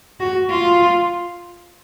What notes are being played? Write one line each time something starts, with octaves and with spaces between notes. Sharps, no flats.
F#4
F4